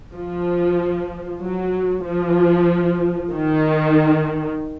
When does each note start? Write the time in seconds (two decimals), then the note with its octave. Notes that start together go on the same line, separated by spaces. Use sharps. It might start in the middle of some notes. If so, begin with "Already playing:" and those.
0.14 F3
1.41 F#3
2.04 F3
3.31 D#3